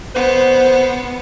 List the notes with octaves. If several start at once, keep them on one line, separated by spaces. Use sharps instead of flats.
B3 C5